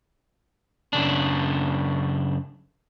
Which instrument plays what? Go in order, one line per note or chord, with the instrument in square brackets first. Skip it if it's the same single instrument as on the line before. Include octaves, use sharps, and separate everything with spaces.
[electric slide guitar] F#2 C#3 D4